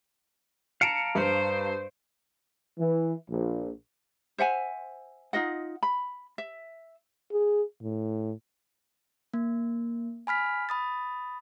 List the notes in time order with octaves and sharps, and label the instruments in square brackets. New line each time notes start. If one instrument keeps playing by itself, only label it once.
[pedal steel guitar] F5 A5 A#5 [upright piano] C#7 D7
[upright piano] G2 [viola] C5
[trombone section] E3
A#1
[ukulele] C5 E5 F#5 G#5
D#4 F4 D#5 F#5
B5
E5
[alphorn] G#4
A2
[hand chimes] A#3
G#5 B5 F6 B6
B5 D#6 A6